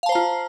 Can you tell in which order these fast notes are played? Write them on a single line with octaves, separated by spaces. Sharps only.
F5 A5 C5 A#5 F4